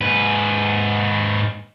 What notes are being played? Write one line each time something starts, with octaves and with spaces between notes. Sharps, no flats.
G#2 B4